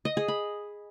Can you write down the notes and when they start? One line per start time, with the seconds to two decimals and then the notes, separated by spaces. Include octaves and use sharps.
0.05 D#5
0.17 G#4
0.28 B5